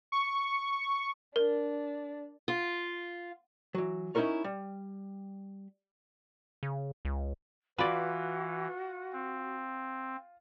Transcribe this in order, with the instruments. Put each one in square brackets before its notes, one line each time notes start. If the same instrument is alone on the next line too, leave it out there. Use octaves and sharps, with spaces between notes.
[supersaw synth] C#6
[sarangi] D4 [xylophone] A#4
[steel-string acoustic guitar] F4
[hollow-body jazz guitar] E3 F#3
C#4 D#4 E4 F#4 A#4 C#5
G3
[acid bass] C#3
C#2
[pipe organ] E3 [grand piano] F4 [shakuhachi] F#4 [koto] B4 D5
[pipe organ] C4